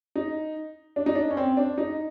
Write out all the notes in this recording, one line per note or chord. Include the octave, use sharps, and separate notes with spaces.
D#4
D4
D#4
D4
C#4
C4
D4
D#4